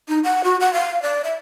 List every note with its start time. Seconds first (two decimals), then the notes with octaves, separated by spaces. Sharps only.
0.09 D#4
0.24 F#5
0.44 F#4
0.61 F#5
0.73 F5
1.02 D5
1.24 E5